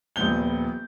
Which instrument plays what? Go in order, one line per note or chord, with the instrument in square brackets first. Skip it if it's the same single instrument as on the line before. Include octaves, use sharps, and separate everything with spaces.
[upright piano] D#1 A#1 B3 G6 G7